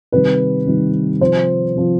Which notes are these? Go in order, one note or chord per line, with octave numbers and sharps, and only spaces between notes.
C3 D#3 G3 B4
C3 D#3 G3
C3 F3 C5
C3 F3